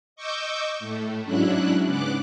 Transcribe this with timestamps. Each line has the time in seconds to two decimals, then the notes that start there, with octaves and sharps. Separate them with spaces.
0.16 D#5 C#6 D6 E6 G6
0.79 A2 A3
1.24 G#2 F#3 C#4 D4 E4 F#6
1.86 G#2 C#3 B3 D6 F#6